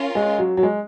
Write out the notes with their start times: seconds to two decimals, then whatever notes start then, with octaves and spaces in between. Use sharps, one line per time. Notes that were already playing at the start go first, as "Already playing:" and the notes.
Already playing: C#4 F4 A#4
0.15 G#3
0.38 F#3
0.57 F#3
0.63 G#3